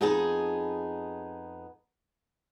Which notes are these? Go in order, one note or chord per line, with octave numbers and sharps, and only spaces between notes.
F2 B3 D#4 G#4 A5